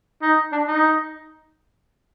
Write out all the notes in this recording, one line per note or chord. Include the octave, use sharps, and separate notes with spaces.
D#4
D4
D#4